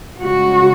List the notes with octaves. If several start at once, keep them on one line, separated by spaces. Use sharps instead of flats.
C#3 G#3 F#4